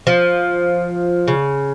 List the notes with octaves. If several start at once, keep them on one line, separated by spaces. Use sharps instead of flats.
F3
C#3